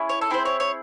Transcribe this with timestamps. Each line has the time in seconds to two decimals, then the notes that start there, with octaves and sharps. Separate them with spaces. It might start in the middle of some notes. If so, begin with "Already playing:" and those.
Already playing: C#4 E4 G#4
0.10 C#5
0.21 A4
0.30 C4 E4 G#4 C5
0.45 C#5
0.60 C#5